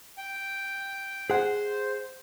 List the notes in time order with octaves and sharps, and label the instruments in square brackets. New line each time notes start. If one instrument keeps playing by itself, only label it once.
[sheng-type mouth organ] G5
[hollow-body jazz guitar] G#4 F#5 [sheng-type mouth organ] C5